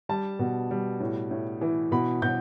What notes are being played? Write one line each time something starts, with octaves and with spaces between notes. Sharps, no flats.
G3 A5
B2
G3
A2
A2
E3
B2 B5
B2 G6